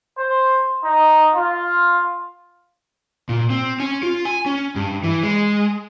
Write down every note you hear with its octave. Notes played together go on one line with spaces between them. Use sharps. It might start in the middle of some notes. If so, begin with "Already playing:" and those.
C5
D#4
F4
A#2
C4
C#4
F4
G#5
C#4
G2
E3
G#3